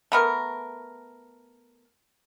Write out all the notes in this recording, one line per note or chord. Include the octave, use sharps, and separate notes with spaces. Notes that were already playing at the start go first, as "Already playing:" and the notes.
A3 B3 A#4